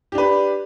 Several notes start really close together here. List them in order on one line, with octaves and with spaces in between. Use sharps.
G4 D4 B4